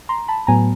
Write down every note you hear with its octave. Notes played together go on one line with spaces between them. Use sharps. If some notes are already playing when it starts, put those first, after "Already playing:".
A#5 C6
A5 B5
A2 F#3 B3 G#5 A#5